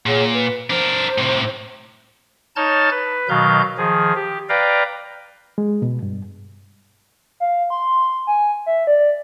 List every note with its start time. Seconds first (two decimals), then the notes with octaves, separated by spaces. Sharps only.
0.06 A#2 G#4 C#5 F#5
0.32 B4
0.70 D4 A#4 C5
1.18 A2 C3
2.56 D#4 C#5 A5 F6 G6 A6
2.91 B4
3.29 B2 D#3 F#3 F5 G6
3.78 D#3 F3 G#4
4.15 G4
4.49 B4 D5 F5 G5 A#5
5.58 G#3
5.82 B2
6.03 G2
7.40 F5
7.70 C6
8.27 G#5
8.66 E5
8.87 D5